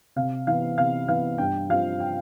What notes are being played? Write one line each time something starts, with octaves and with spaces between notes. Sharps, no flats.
C3 F5
E3 B3 F5
C3 F5
E3 B3 F5
G2 G5
F3 C4 F5
G5